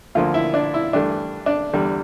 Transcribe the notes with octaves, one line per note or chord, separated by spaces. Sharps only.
D2 D3 F3 A#3 F4
E4
D4
E4
G2 E3 A3 D4
D4
E2 D3 G3